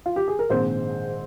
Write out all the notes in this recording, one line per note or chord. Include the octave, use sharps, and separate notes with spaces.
F4
G4
G#4
A#4
A#1 G#2 D#3 G#3 C4 C5